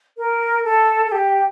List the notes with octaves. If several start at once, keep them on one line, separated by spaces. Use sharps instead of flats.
A#4
A4
A4
G4